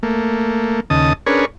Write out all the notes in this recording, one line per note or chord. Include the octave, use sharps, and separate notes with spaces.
A3 A#3
D#2 C#3 D#5 A5 D#6
C#4 D4 G#4 A#4 B4 C#5